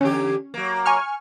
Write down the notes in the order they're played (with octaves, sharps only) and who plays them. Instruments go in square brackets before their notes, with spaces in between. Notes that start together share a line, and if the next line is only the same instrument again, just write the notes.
[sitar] E2 D3 G4 [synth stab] C#4
[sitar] F#3 A#3
[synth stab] G#5 C#6 F6